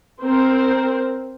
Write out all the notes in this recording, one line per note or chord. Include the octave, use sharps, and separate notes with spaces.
C4 A#4 C5